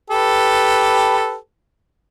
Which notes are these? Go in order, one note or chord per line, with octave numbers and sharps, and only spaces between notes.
G4 A4 B4